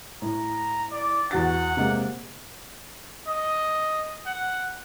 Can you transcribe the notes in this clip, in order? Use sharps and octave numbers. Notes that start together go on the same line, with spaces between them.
A2 A#5
D5
E2 F#4 F#5 A6
C3 G#3 A#3
D#5
F#5